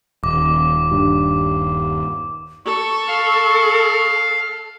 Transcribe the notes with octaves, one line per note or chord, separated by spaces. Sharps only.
D#1 D6
G2
A4 C#6
F5